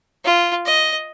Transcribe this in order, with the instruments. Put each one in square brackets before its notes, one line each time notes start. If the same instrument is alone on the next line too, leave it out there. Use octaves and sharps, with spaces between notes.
[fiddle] F4
D#5